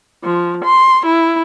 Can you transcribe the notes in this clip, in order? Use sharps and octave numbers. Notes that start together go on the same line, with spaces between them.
F3
C6
E4